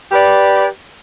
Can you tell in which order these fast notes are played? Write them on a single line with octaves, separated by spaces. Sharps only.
G4 B4 D5